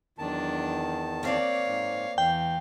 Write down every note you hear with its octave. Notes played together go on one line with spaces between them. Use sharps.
E2 D#3 F#3 D4 A5
A#3 C4 C#5 D5 F5
G#2
E2 E3 F5 G5